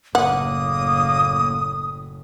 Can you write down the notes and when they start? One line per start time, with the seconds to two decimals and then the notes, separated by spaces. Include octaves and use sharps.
0.15 F#1 A2 A#3 F#5 D#6